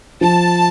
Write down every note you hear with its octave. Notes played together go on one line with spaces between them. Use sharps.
F3 A5